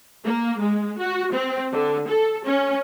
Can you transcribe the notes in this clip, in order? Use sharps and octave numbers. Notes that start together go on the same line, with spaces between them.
A#3
G#3
F#4
C4
D3
A4
C#4